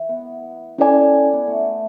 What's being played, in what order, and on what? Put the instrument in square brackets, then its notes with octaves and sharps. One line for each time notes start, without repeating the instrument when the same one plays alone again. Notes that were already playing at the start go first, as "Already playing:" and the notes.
Already playing: [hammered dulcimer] E3
B3
[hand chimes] C#4 E4 A4 D5 G#5
[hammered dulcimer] B3
A3